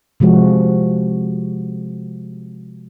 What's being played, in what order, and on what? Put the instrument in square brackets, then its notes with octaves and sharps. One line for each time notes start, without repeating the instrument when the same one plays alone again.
[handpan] C3 F3 G#3 F#4